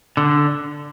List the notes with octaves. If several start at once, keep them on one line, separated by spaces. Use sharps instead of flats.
D3